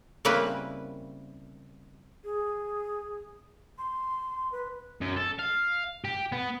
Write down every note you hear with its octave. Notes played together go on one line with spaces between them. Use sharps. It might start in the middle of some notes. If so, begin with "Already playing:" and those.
C#3 G3 A#3 C4 E4 B4
G#4
C6
B4
F#2
A4
F5
G4
B3